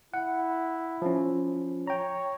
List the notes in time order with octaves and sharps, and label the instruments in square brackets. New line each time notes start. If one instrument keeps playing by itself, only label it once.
[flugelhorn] E4 [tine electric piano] F#5
[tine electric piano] F3 C#4
[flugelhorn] C#5 [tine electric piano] G5 A#5